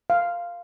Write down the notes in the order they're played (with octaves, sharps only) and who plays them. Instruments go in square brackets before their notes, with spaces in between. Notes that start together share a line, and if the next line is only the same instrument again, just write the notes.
[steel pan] F5